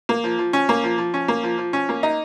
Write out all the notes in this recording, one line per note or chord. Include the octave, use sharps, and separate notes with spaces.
A#3
F3
F3
C#4
A#3
F3
F3
C#4
A#3
F3
F3
C#4
A#3
D#4